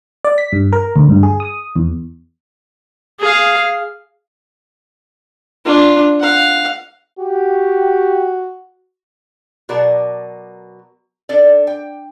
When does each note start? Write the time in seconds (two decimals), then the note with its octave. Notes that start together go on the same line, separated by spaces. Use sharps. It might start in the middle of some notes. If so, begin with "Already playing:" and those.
0.25 D5
0.38 B6
0.52 G2
0.73 A#4
0.96 D2
1.09 G2
1.23 G#4
1.40 D#6
1.76 E2
3.20 G#4 F5
5.65 D4 F4
6.20 F5 F#5
7.19 F#4 G4
9.69 B2 F#3 A#4 D5 A5
11.29 D4 A4 D5
11.67 G5